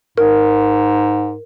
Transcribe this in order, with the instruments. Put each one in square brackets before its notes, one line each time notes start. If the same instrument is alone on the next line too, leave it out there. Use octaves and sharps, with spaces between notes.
[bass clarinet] G#2 [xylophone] A#4